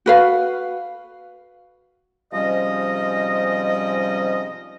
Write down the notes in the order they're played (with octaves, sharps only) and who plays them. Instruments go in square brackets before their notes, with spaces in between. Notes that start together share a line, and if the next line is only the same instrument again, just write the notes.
[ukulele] F#4 B4 F5
[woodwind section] G#2 C3 F3 G3 C#4 D#5